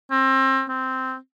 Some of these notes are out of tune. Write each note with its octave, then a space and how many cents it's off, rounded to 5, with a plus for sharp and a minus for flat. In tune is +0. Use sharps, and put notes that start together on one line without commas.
C4 +30
C4 -10